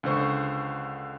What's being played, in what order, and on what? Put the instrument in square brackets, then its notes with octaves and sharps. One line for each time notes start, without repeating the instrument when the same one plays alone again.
[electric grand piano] C#2 D3 C5 C#6